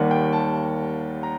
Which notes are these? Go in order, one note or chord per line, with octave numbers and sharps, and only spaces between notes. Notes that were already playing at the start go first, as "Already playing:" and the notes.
Already playing: D#2 D#3 G3 A#3 F#5
G5
A5
A#5